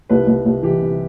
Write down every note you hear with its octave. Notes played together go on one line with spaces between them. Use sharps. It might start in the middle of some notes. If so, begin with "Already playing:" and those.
C2 B4
C2
C2
E3 G4
C3